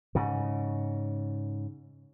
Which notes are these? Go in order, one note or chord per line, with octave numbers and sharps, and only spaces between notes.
G#2 C#3